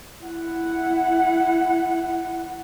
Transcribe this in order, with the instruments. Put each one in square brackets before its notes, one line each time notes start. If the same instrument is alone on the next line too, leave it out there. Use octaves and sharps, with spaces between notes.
[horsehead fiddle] E4 F#5